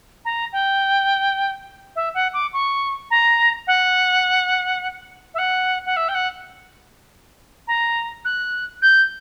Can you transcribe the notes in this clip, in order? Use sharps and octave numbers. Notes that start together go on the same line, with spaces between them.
A#5
G5
E5
F#5
D6
C#6
A#5
F#5
E5
F#5
F#5
E5
G5
F#5
A#5
F#6
G6